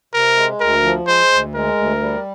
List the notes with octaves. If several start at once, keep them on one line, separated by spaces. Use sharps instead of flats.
C3 A#4
G#3
D2 A#4
F3
G#3 C5
D2
G#3 A#4
D2
G3